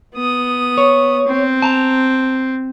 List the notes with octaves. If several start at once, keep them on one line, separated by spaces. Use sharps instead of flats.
B3 D#6
C#5
C4
A5 A#5